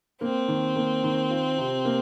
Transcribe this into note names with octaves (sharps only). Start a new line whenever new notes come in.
A#3 C4
D#3
A#3
D#3
F4
C3
A#3